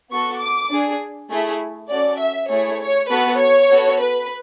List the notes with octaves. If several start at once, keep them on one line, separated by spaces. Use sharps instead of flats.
B3 F#4 A4 C#6
D6
D4 G#4
A3 E4 G#4
C#4 F#4 A4 D5
E5
A3 E4 G#4 C#5
C#5
B3 F#4 A4 B4
C#5
B3 F#4 A4
B4